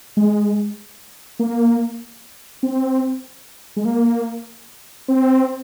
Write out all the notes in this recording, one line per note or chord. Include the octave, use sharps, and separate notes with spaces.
G#3
A#3
C4
G#3
A#3
C4